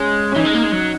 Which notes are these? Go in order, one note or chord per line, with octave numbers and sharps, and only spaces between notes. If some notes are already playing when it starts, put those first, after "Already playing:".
Already playing: G#3 C#4
C#4
E3 D#4
G#3
A#3
G#3
F#3